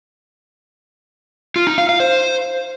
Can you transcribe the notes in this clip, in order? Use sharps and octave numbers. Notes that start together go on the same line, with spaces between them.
F4
D#4
F5
F5
C5